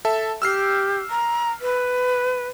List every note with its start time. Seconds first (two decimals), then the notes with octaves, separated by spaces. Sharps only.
0.05 A4 E5 A5
0.42 G4 E6 F6 C7
1.10 A#5
1.61 B4